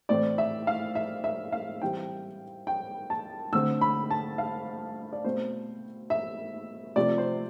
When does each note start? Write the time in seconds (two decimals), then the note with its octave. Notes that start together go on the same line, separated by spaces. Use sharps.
0.09 A2 E3 A3 C4 D5
0.38 E5
0.67 F5
0.95 E5
1.24 E5
1.52 F5
1.81 E3 G3 C4 G5
2.67 G5
3.10 A5
3.53 D3 A3 C4 E6
3.81 B5
4.10 A5
4.38 F5
5.13 D5
5.24 B2 A3 C4 C5
6.10 E5
6.96 C3 F3 A3 C4 D5
7.18 C5